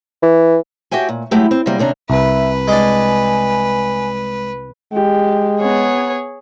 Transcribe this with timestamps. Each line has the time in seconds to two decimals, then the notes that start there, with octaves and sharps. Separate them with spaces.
0.23 E3
0.91 F#4 G4 E5 G5 G#5
1.09 A#2
1.31 F#3 G#3 A3 E4 G4
1.51 C4
1.66 C3 F#3 G3 A#3
1.78 D#2 C3 C#4 D4 A#5
2.10 C2 B4 E5
2.68 G#3 D4 G#5
4.93 G#3 G4
5.61 B3 G#4 C#5